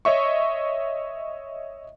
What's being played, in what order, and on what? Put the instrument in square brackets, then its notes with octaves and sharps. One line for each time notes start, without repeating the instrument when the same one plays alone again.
[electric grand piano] C#5 D#5 E5 C#6